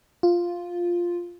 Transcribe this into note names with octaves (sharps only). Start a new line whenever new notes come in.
F4